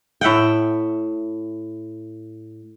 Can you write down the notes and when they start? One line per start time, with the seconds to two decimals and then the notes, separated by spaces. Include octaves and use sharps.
0.21 A2 E5 F#5 G5